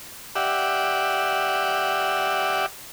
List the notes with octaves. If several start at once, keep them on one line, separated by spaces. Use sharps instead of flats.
G4 D5 E5 F#5